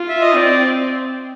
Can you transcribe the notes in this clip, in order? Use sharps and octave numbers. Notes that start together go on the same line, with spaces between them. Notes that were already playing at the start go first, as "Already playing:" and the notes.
Already playing: F4
E5
D#5
C4 D5